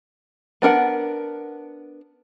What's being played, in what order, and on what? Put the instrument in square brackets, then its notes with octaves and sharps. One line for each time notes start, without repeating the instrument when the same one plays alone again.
[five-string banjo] B3 D4 A#4 F#5